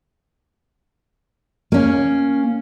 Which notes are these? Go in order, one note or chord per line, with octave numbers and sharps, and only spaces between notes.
A#3 C#4